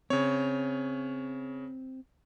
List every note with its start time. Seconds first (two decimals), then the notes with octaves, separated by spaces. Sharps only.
0.10 C#3 C4 C#5